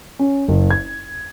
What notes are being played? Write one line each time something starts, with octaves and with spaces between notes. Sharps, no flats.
C#4
F#1
G#6